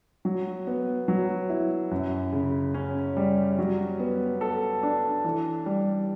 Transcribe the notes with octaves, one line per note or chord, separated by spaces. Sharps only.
F#3
B3
F#3
E4
F#2
C#3
C#4
G3
F#3
B3
A4
D4
E3
G3